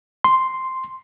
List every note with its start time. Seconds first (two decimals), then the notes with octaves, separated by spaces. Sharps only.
0.24 C6